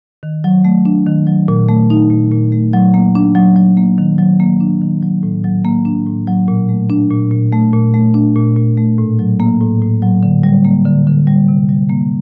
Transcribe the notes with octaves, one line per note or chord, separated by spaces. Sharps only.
D#3
F#3
A3
D4
D#3
F#3
A#2
A3
D#4
A#2
A#2
A3
F#3
A#3
D4
F#3
F#3
A#3
D#3
F#3
A#3
D4
D#3
F#3
A2
F#3
A#3
D4
A2
F#3
A#2
A3
D4
A#2
A#2
A3
A#2
A3
D4
A#2
A#2
A3
A2
F#3
A#3
A2
A2
F#3
D3
G3
A#3
D3
D3
G3
C3
G3
A#3